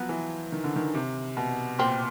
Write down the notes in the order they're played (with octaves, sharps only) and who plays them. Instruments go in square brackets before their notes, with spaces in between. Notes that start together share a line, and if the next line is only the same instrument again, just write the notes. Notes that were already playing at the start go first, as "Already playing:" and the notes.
Already playing: [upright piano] F3 F#3 [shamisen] B3
[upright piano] E3
D#3
D3
D#3
C3
B2
[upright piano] A#2 [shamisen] C4